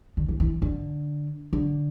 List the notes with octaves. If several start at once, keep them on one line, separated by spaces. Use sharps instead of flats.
D3
E3
E3
D3
D3